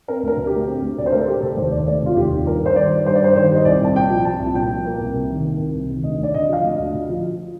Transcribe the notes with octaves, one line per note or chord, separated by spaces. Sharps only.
C4 A#4
D2 A#4
D3
G4
A3
C4
D2
D3 D5
C5
A3 A#4
A4
A3 G4
F1 A4
D#2 C5
D#3 D5
A3 D5
F1 F4
D#2 G4
D#3
G2 A#4
G2 C5
D#3 D5
G3
G2 C5
D5
G2 C5
D#3 C5
G3 D#5
C2 D5
C2 A5
A#2 G5
F3
C2 A5
C2
A#2 G5
F3
A#3
C2
C3
D#3
A#3
C2
C3
D#3
D2 D#5
D2 D5
D3 D#5
F3 F5
D2 D#5
D2
D3
F3